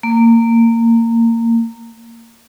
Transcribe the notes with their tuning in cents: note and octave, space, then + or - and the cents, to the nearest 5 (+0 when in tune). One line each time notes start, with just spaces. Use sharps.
A#3 -25